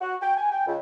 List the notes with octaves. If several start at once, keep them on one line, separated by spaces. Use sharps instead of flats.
F#4
G5
G#5
G5
C#2